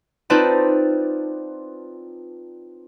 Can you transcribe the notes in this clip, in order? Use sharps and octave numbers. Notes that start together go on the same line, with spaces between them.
C4 D#4 F4 B4 D5 A5